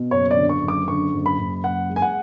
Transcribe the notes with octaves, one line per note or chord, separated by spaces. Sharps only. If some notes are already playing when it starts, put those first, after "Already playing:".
Already playing: B2
F#1 C#5
D5
D3
C#6
F#1
D6
D3 C#6
F#1
B5
F#1
F#1 F#5
G#3
G#5
F#5